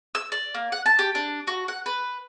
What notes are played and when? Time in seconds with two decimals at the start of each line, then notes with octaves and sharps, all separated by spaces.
0.15 E6
0.32 D5
0.54 A#3
0.72 F#5
0.86 A5
0.99 G4
1.15 D4
1.47 F#4
1.68 F#5
1.86 B4